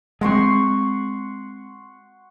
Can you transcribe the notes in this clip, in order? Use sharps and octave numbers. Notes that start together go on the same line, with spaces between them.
G#3 C4 F#5 C6 C#6